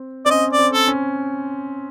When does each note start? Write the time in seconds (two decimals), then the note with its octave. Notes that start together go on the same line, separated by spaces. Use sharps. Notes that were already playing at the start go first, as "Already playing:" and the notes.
Already playing: C4
0.26 C4 D5
0.30 C#4 D#5
0.53 D5
0.59 C4
0.73 A4
0.87 C#4